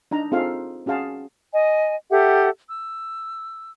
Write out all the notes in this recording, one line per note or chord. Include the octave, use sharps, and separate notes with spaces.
D4 D#4 A#5
C4 D#4 F4 G#4 A4 F5
C#4 F#4 G#4 F5 A5
D#5 G#5
G4 A4 E5 F#5
E6